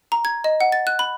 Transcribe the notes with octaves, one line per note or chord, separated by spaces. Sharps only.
A#5
G#6
D#5
F#5
A6
F#6
B5